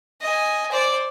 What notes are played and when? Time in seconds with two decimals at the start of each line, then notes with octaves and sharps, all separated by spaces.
0.21 D#5 G#5
0.71 C5 D5